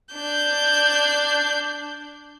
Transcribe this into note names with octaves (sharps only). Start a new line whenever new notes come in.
D4 G6